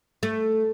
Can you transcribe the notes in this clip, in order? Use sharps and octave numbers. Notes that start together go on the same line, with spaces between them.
A3